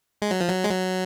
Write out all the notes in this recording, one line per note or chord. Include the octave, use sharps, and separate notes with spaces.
G#3
F#3
F3
F#3
G#3
F#3